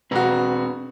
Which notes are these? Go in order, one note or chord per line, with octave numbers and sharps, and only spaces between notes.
E1 C4 F#4 B4 A#5